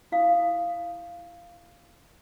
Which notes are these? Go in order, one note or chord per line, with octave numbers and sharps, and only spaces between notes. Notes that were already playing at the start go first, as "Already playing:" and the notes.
E4 F5 D#6